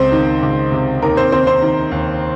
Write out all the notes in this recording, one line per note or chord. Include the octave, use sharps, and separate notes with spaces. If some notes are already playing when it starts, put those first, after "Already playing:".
Already playing: C#2 C4 C5
D#3
C#2
C3
D#2 A#4
C4 C5
D#3 C4 C5
C4 C5
D#3
D#2